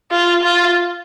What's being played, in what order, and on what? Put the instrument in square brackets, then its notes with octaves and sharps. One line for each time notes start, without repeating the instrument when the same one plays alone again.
[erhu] F4
F4